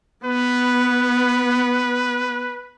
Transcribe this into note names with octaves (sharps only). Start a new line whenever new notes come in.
B3 B4